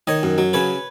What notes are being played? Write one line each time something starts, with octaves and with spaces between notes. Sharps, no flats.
D#3 C#5 D#5
F#2
F#3
C#3 B4 C#5